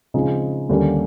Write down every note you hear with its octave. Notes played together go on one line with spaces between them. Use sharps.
C#3 F3 G#3 C4 D#4
D#2 D3 G3 A#3 C#4